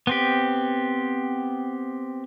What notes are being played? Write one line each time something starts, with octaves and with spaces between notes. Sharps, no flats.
B3 C4 G4